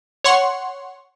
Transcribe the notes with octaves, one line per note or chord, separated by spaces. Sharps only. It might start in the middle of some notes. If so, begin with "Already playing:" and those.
C#5 F#5 C6 C#6